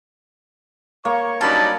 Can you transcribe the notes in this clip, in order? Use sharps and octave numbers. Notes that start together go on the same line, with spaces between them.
A#3 C#5 C#6
G2 F#3 C#4 D#4 D5 A5 B5